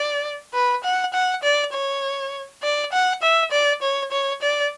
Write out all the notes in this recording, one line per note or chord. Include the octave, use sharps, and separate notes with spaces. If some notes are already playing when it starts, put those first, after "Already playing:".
Already playing: D5
B4
F#5
F#5
D5
C#5
D5
F#5
E5
D5
C#5
C#5
D5